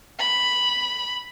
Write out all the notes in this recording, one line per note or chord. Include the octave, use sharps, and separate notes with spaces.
B5